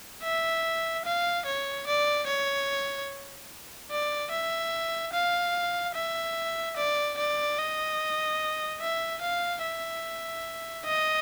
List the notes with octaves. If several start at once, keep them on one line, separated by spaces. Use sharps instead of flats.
E5
F5
C#5
D5
C#5
D5
E5
F5
E5
D5
D5
D#5
E5
F5
E5
D#5